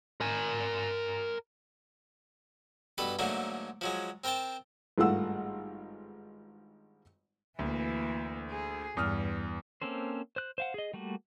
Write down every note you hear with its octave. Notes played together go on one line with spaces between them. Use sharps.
A#4 G#5
G2 B2 A4 B4
G#2 D3 F#3 A3 A#3
F3 F#3 G#3
C4 A#4 C5 G5 A5
G#1 G2 A3 F4 F#5 E6
D2 E3 A#3
G#4
E2 G2 D#6 F6
A#3 C4 C#4 A4 C5
C5 F#6
C5 F5 F#5
G#4 D#5
G3 A3 A#3 F#4